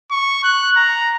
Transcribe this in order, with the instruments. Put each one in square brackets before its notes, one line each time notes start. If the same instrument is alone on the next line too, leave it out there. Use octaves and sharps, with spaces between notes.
[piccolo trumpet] C#6
F#6
A#5